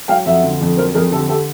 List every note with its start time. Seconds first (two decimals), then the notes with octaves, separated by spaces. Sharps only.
0.08 F#3 F5 G5
0.26 F2 E5 F#5
0.43 D3
0.61 F2
0.77 F#3 A#4 C5
0.95 F2 G#4 A#4
1.11 D3 G4 A4
1.29 G4 A4